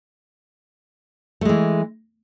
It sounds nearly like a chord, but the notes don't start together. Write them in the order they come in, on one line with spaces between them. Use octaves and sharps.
A3 G#3 E3